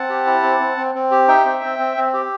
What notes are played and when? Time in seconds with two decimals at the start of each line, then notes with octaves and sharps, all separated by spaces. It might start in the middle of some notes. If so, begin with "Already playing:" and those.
Already playing: C4 F#5 A5
0.09 G4
0.27 E4
0.43 C4
0.60 C4
0.77 C4
0.95 C4
1.11 G4
1.28 D#4 E5 G5
1.45 C4
1.63 C4
1.79 C4
1.97 C4
2.13 G4